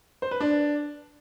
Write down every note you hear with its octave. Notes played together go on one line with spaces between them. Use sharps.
C5
B4
D4